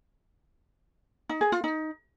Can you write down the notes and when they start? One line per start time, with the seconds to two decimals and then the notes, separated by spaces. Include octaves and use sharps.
1.29 D#4
1.41 G#4
1.52 F4
1.64 D#4